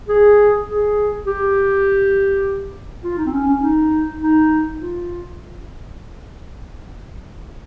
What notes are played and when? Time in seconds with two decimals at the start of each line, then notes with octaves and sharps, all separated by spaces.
0.08 G#4
0.68 G#4
1.27 G4
3.04 F4
3.18 D#4
3.26 C4
3.33 C#4
3.47 C#4
3.62 D#4
4.21 D#4
4.80 F4